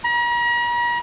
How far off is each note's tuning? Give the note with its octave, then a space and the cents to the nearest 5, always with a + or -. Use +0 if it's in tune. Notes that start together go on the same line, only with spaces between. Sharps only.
A#5 +45